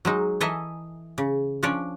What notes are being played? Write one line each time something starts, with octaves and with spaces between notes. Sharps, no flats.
F#3 G#3 D#4
E3 A4 D#5 E5 G#5 A#5
C#3
F3 C#4 D4 C#5 D5